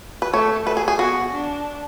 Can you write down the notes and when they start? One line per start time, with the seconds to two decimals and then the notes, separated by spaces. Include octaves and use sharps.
0.22 B4
0.33 A3 C#5
0.65 A3 B4
0.77 G#4
0.88 G#4
0.99 B3 F#4
1.32 D4